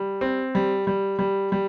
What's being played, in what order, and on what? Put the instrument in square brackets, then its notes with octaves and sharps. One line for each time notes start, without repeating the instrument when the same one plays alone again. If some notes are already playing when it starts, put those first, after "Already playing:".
Already playing: [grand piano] G3
C4
G3
G3
G3
G3